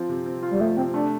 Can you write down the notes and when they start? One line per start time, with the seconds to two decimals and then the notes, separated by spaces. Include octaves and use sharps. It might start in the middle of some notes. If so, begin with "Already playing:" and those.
Already playing: F3 C4 F4
0.09 C3
0.26 C4
0.43 F4
0.51 G3
0.60 F3 A3
0.77 C3 C4
0.94 A3 D4